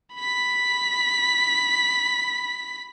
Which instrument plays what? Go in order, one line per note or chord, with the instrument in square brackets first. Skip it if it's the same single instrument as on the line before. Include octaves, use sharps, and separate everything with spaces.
[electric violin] B5 B6